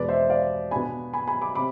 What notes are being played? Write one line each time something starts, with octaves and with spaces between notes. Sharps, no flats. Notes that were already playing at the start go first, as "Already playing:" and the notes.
Already playing: E2 B2 G#3 B4 D5
C5 E5
D5 F5
B2 B3 D4 G#5 B5
G#5 B5
G#5 B5
B5 D6
C3 B5 D6